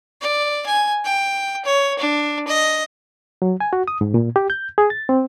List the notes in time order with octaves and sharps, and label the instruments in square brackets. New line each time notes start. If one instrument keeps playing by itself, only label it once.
[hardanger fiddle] D5
G#5
G5
C#5
D4
D#5
[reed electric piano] F#3
G#5
F#4
D#6
G#2
A#2
G4
G6
G#4
A6
C4